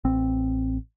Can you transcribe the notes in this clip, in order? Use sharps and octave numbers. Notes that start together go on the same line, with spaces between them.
A1 C4